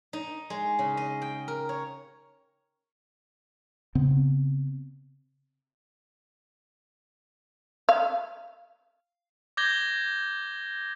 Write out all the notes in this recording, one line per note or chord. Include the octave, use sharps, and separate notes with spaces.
D#4
G#3
C#3
D#5
G5
A#4
C#5
C#3 B3 C4
F5
D6 G6 G#6 A#6 G7